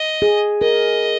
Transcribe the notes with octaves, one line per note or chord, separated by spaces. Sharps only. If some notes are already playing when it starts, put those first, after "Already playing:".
Already playing: D#5
G#4
A#4 D#5